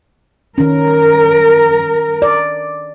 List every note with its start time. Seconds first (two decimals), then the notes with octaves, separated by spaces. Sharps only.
0.58 D#3 C#4 A#4
2.22 D5